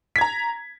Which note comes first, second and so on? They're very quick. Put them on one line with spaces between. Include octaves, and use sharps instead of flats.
B6 G#6 A#5